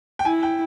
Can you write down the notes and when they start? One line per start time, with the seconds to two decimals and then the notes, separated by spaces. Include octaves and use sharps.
0.19 G5
0.25 E4 G#5
0.43 G5